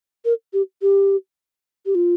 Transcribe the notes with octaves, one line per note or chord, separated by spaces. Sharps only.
A#4
G4
G4
G4
F4